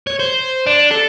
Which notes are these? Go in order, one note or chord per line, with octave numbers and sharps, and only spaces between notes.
C#5
C5
D4
A4